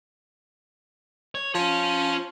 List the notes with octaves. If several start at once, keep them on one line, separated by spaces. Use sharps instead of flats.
C#5
F3 C#4 C#5